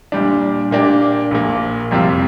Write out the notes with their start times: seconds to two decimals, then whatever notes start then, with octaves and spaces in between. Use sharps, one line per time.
0.12 A#2 G3 D4
0.71 A#2 A#3 D4 G4
1.31 A#1 A#2 A#3
1.91 F2 C3 G3 C4 F4